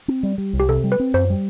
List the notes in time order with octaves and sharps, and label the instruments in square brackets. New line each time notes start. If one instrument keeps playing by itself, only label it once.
[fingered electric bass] C4
G3
G3
C2
[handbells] G4
[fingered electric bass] C3 [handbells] A4
[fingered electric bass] G3
[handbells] B4
[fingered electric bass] C4
[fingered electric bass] F#2 [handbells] C5
[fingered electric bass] G3